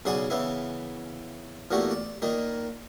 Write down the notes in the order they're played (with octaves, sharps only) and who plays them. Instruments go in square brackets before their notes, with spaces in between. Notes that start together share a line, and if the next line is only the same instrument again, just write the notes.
[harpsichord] B1 C#3 G#4 D5 F#5 G#5
C#3 E3 B3 E4
E2 A#2 A3 F#4 G4
D5
A#2 D#3 A#3 D#4